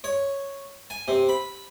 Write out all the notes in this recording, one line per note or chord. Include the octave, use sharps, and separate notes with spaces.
C#5
G#5
C3
B5